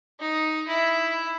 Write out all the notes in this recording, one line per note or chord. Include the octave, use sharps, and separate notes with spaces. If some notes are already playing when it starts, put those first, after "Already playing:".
D#4
E4